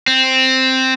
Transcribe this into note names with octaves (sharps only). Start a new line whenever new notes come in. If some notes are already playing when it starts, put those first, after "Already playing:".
C4